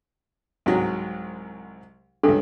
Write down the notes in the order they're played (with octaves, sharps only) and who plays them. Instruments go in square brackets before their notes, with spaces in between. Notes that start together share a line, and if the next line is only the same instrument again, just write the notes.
[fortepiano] C2 G#2 F#3
[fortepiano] C#2 G2 [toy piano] D4 A4